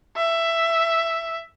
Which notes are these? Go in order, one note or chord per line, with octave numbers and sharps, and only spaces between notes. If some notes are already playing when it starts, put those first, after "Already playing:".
E5